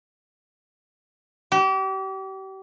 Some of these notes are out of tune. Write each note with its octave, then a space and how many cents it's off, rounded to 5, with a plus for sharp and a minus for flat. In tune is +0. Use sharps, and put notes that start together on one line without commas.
G4 -35